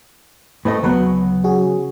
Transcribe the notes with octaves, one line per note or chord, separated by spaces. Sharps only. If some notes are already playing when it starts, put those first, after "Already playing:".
A2 A3 C4 B4 D#5
D2 C#3 F#3 B3 B4
C#4 F#4 G#4